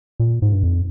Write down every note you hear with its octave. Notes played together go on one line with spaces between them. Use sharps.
A#2
G#2
G2
F2